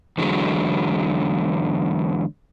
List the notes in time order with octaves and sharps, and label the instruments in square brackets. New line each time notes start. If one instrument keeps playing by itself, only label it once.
[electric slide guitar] E2 D3 F#3 G#3